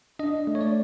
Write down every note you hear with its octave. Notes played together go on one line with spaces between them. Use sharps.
D4 D#5
A3
C#5
D5